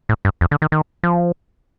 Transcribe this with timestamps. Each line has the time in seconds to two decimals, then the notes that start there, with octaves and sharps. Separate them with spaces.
0.09 A2
0.25 G2
0.41 F2
0.51 D3
0.62 D#3
0.72 D#3
1.03 F3